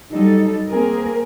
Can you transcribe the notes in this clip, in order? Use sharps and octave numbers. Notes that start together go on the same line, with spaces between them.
F#3 G3 D#4 A4
A#3 C4 G#4 A#4